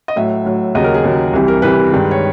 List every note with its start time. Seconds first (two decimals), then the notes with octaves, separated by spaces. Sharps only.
0.08 D#5
0.16 A2 F#3 E5
0.45 A2 F#3
0.75 D#2 C#3 F#3 D#5
0.84 A#4
0.94 G#4
1.04 D#2 C#3 F#3
1.33 C2 C3 E3 G3
1.48 A#4
1.62 C2 C3 E3 G3 B4
1.92 G2 D#3 G#3
2.11 C#5